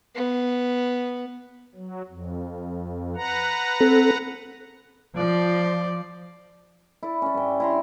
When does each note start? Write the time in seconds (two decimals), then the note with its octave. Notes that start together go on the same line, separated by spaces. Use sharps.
0.15 B3
1.75 F#3
2.09 F2
3.16 B4 F#5 A#5
3.80 C4 A4
5.17 F3 D5 C6
7.03 E4 D5
7.22 C#4 D5
7.34 G2 G5
7.60 E4 A#5 C6